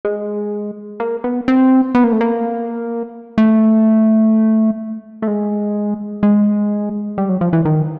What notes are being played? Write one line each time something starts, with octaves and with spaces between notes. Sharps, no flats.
G#3
A#3
B3
C4
B3
A#3
A3
A#3
A3
A3
G#3
G#3
G3
F#3
F3
E3
D#3